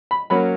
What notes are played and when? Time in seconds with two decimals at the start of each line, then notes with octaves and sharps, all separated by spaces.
0.11 B5
0.30 F#3 A#3 C#4 B5